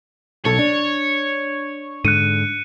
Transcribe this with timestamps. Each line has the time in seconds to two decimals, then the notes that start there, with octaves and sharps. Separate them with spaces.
0.45 B1 A4 C#5
0.59 D4
2.05 G#2 D3 F#6 C#7 D#7